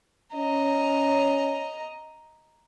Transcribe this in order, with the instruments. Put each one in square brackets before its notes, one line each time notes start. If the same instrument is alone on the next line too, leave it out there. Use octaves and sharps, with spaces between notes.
[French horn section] C#4 [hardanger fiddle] D#5 A#5